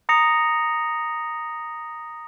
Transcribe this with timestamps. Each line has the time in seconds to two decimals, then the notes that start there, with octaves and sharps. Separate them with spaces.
0.09 A#5 D#6 A#6 C#7 F7